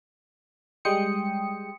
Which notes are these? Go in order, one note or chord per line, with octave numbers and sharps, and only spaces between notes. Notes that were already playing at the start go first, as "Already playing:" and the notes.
G3 G#3 G5 C6 D#6 C#7